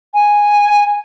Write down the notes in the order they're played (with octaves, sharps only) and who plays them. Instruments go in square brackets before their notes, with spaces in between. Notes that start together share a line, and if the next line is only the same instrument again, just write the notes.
[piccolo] G#5